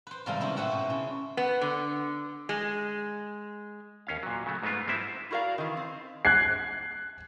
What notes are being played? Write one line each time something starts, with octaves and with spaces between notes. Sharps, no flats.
B4 C5
G#2 C3 D#3 G3 A4 F5
C#3 B3 E4 F#4 C5
A2 C#4 B4 C5 E5 F#5
B2
C#3
B3
D3
G#3
D#2 C#4 F5
A#2 F#3
C#3 F#3 A3
G#2 G#3 A3 B3 F4
G3 G#3 C4 E4 E5
E4 F#4 A#4 D5 F5
D#3 E3
C4
F#6 G#6 C7